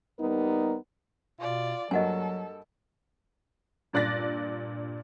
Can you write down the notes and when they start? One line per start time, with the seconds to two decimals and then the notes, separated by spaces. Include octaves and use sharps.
0.18 D#2 G3 B3 D#4 A#4
1.41 B2 F4 D5
1.91 G2 F#3 A#3 F#4 A4 D#5 F#5 G#5
3.93 G2 A#2 D5 F#6 A6 A#6